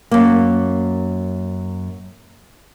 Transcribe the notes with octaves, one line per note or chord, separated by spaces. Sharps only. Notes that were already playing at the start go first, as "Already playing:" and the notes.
F#2 A#3